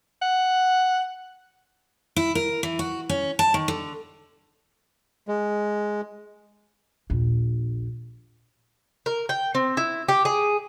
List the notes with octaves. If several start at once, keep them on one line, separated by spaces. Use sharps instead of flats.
F#5
E4
A#4
E3
F#4
C#4
A5
D#3
D3
G#3
A#1 D#2
A#4
G5
C4
E4
G4
G#4